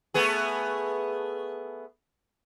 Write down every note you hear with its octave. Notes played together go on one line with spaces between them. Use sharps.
A3 B3 G#4